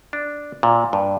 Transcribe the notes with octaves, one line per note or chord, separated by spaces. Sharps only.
D4
A#2
G2